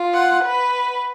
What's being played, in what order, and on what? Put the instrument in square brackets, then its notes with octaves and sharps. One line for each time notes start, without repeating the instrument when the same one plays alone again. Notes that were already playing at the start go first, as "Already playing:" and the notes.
Already playing: [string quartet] F4
[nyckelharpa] F#5
[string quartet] B4